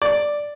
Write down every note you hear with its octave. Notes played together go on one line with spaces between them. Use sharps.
D5